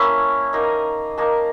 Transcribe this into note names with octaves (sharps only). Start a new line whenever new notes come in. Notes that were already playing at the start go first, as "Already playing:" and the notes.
Already playing: A#3 C#4 E4 A5
A#3 D#4
A#3 D#4 A5